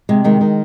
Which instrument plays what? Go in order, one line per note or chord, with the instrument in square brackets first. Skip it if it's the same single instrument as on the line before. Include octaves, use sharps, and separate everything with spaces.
[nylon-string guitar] C3 G#3
D#3 G#3
D#3